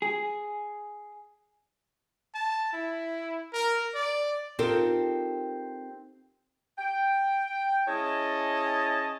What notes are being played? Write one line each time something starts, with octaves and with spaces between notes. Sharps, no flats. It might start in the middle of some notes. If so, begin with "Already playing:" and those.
G#4
A5
E4
A#4
D5
C4 D#4 F4 G4 A4 A#4
G5
C#4 E4 G#4 C#5 D#5 A5